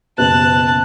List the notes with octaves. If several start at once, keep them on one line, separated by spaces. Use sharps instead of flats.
F#1 B2 B4 A5 F#6